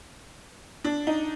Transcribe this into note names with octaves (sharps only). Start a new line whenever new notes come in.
D4
D#4